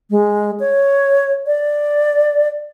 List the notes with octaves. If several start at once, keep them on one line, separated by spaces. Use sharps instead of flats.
G#3
C#5
D5